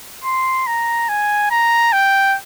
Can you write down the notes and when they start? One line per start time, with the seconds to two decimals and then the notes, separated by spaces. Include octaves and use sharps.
0.24 C6
0.67 A#5
1.09 G#5
1.51 A#5
1.93 G5